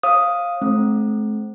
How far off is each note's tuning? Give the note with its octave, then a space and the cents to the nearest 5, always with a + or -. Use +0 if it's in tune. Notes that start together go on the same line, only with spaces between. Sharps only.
C#5 -40 F5 +0 D#6 +0
A3 -40 C4 +15